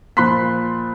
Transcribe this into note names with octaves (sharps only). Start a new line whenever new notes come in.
A#2 F3 B5 C6 F#6 B6